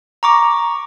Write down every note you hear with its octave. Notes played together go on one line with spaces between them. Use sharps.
A#5 C#6 D6